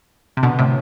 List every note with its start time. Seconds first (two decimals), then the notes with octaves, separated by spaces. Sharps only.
0.37 C3
0.43 B2 D3
0.59 A2 C3